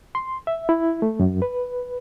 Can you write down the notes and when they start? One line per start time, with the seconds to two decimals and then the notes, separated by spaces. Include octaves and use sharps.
0.15 C6
0.47 E5
0.69 E4
1.02 A3
1.20 F#2
1.42 B4